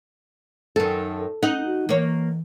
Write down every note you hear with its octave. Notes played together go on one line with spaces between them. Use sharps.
F#2 D#3 A4
C#4 D#4 D#5 F#5
F#4
E3 A#3 C#5